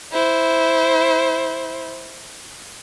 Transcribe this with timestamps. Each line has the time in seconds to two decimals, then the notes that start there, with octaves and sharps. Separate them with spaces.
0.12 E4 C5